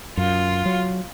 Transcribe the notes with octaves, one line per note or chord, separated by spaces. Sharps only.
F#2 F4
F#3